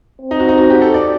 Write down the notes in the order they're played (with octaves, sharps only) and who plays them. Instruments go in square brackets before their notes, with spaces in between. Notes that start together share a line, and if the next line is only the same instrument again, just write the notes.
[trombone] C4
[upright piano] D#4
F#4
D#4
F#4
G4
A4
D5